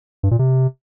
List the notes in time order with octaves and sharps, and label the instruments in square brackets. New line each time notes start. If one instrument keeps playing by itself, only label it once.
[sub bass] G2
A#2
C3